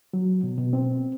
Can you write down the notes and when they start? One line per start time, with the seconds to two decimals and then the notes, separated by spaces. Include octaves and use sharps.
0.13 F#3
0.43 B2
0.58 B2
0.73 C4